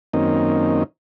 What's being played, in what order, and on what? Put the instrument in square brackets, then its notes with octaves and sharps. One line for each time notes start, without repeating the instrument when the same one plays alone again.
[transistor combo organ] F#2 D#3 A#3 C4 C#4 D#4